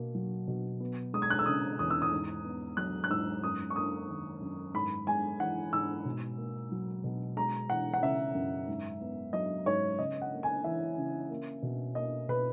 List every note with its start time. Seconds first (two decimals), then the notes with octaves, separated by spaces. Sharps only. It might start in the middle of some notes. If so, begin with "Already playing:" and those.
Already playing: B2 A#3
0.15 F#3
0.48 B2
0.80 B3
1.14 G#3 D#6
1.22 G#6
1.30 F#6
1.39 E6
1.46 C#3 D#6
1.79 E2 D#6
1.90 E6
2.02 D#6
2.11 G#2
2.44 B3
2.77 F#3 F#6
3.04 F#6
3.10 G#2 E6
3.43 F#2 D#6
3.70 C#6
3.76 A#3 D#6
4.08 D#3
4.42 F#2
4.74 G#2 B5
5.07 G#3 G#5
5.40 E3 F#5
5.73 G#2 E6
6.05 B2
6.38 A#3
6.72 F#3
7.04 B2
7.36 G#3 A#5
7.69 E3 F#5
7.94 F#5
8.02 C#3 E5
8.35 F#2
8.68 G#2
9.01 B3
9.33 F#3 D#5
9.66 G#2 C#5
9.98 C#3 D#5
10.21 F#5
10.32 A#3
10.43 G#5
10.64 E3 E5
10.98 C#3
11.30 A#3
11.63 B2
11.95 A#3 D#5
12.28 B2 B4